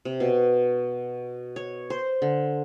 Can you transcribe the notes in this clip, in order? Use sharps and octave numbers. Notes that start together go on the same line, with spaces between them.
C3
B2
C#5
C5
D3